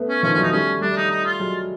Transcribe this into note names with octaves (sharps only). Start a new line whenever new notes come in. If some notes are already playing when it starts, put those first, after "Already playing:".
Already playing: A3 B3
C#4
D#3 F3 C#4
C#4
E3 F#3 D#4
G3 A3 C#4
G3 A3 D4
D#4
D#4
F4
F#3 G#3